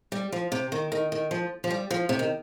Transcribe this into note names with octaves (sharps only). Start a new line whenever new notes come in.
G3
F3
C3
D#3
D#3
D#3
F3
F3
G3
F3
C3
D#3